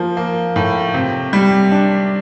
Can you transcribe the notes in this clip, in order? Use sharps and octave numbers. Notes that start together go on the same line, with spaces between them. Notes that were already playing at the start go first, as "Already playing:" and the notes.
Already playing: F3 A#3
A#3
A2
C3
G3
D4